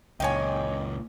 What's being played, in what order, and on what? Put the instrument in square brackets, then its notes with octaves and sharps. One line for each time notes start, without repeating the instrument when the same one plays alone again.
[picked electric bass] C#2 [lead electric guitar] F#2 A#2 [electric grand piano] C#5 G5 [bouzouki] D#5 F5 G#5